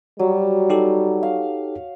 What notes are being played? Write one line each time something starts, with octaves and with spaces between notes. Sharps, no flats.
F#3 G3
D#4 G4 A4
F5